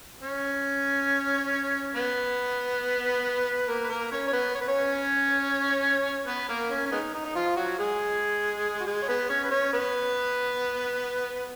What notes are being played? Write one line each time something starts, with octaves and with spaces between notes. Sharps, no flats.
C#4 C#5
B3 B4
A#3 A#4
B4
A#3 A#4
C#4 C#5
C#5
B3 B4
C#5
B4
C#4 C#5
B3 B4
A#3 A#4
C#4
C#4
G#3 B3 D#4
D#4
D#4
F3 F4
F#3 F#4
G#3 G#4
F#4
G#3 G#4
C#5
B3 B4
C#4 C#5
B4
C#4 C#5
B3 B4